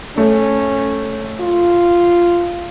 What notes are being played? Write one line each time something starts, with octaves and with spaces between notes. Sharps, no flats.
A3 C#4
F4